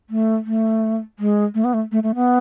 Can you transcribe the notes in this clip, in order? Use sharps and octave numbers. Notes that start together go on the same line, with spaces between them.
A3
A3
G#3
A3
B3
A3
A3
A3
B3